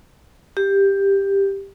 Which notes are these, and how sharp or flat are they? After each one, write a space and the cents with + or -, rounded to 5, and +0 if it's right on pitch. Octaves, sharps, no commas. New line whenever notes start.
G4 +10